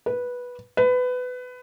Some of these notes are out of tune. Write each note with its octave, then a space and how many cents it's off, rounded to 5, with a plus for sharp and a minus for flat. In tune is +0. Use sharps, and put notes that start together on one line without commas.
B4 -10
B4 +20